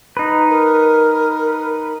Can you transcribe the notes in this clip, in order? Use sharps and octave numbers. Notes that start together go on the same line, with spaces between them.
D#4 B4
A#4